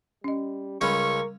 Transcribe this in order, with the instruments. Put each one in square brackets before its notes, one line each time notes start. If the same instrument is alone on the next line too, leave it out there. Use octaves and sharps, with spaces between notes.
[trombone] G3 [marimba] C#4 D#5
[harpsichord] C#2 C#4 [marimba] G3 B5 [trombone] A#4 [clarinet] C#6